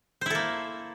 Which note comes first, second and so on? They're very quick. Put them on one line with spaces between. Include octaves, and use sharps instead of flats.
C5 E4 A4 A#3